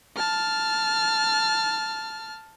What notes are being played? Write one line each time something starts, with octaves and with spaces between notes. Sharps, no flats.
A5 F6